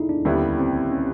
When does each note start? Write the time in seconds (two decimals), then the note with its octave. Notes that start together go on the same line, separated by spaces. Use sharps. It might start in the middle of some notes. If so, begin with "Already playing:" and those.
Already playing: D#4 E4 G#4 A4 D5
0.09 D4
0.25 D#2 D3 G3 B3 C#4 E4
0.59 C4
0.91 C#4